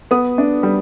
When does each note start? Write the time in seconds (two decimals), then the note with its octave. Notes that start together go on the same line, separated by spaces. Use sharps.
0.11 B3 D#6
0.38 D4
0.63 G3